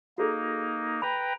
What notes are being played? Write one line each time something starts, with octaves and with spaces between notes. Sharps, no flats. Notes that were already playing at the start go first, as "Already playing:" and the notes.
A#3 D#4 F#4 G#4 A4
B4 G5 A#5 B5